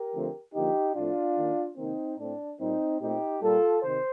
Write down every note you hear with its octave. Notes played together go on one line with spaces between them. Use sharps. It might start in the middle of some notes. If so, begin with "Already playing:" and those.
Already playing: G4 A#4
D3 F3 A3 C4
D3 F3 A#3 D#4 G4
A2 F3 A3 C4 D4 F4
D#3 A#3
C3 D#3 A#3 C4 D#4
A2 A3 C4 D4
A#2 G3 A#3 C4 D#4
A#2 A3 C4 D#4 G4
A#2 G3 A#3 F4 A4
C3 D#3 C5